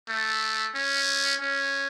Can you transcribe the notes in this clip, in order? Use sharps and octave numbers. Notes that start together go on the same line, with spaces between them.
A3
C#4
C#4